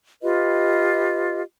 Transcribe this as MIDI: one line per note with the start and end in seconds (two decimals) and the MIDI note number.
0.22 1.42 65
0.22 1.42 67
0.22 1.42 71
0.22 1.42 75